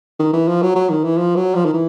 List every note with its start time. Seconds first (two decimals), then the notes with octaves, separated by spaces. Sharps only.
0.19 D#3
0.33 E3
0.48 F3
0.62 F#3
0.75 F#3
0.89 D#3
1.04 E3
1.17 F3
1.36 F#3
1.55 F3
1.65 D#3
1.73 E3